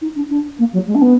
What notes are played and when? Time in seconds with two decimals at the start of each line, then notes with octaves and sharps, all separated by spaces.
0.01 D#4
0.15 D4
0.30 D4
0.58 A#3
0.72 F#3
0.87 G#3
0.94 D4
1.01 B3